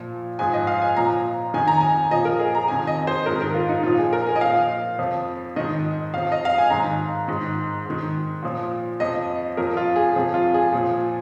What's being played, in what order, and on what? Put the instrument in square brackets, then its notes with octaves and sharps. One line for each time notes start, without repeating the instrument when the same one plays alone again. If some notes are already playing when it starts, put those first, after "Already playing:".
Already playing: [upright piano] A#2 F3
G#2 F3 G#5
D#5
F5
G#5
A#2 F3 A#5
F2 D#3 G#5
A#5
G#5
A#2 F3 D#5
A#4
G#4
A#5
F2 C3 D#3 G#5
D#5
C5
G#2 A#4
D#3
A#4
F4
D#4
A#2 F3 F4
G#4
A#4
G#5
D#5
A#2 F3 F5
F2 F3
G#2 D#3 D#5
F2 F3 F5
D#5
F5
G#5
G#2 D#3 A#5
G#2 D#3
G#2 D#3
A#2 F3
F2 F3 D#5
F2 F3 A#4
F4
G#4
F2 C3 F3 G#4
F4
G#4
A#2 F3